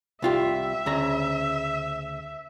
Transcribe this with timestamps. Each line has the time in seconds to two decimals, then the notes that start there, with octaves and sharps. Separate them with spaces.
0.22 C2 F4 G4 E5
0.86 D2 C#3 A#5